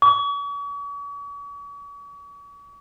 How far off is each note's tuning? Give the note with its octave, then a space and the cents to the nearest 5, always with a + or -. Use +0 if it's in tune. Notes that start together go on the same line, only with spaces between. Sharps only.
C#6 +45